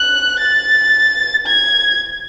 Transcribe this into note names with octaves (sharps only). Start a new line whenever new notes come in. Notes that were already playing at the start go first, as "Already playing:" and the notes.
Already playing: F#6
A6
G#6